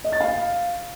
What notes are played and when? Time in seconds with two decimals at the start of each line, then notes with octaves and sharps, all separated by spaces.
0.04 D#5
0.12 A6
0.20 F5